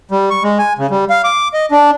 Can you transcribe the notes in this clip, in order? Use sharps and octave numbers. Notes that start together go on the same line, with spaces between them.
G3
C#6
G#3
G#5
C#3
G3
F5
D6
D#5
D4